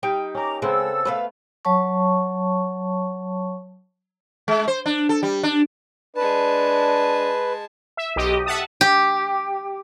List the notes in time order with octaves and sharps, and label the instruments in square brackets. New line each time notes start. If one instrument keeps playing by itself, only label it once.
[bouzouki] G3 D#4 G5
[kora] C#4 A#4 [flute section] A#5 D6
[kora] C#3 B3 C4 [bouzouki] G#3 [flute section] A4 E6
[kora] A3 B3 [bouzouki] B4 C5 F5
[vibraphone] F#3 C#5 A5 C#6
[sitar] G#3
C5
D4
A4
G3
D4
[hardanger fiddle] G#3 A5 [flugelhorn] D4 [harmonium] B4
[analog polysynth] E5
B1 G4 D#5
E5 F#5 A5 D#6
[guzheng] G4